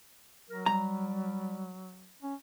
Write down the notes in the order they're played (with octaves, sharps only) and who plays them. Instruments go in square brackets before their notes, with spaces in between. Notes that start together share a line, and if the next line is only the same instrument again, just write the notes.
[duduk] F#3 [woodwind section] A#4
[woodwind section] G3 [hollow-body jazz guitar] A#5
[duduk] C#4